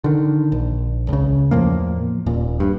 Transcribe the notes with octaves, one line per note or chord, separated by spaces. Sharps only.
D3 D#3
A#1
C#2 C#3
E2 A2 F3 A#3
D#1 A#2
G2